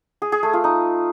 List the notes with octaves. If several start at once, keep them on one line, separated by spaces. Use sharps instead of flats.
G#4
G#4
A3
F4
D#4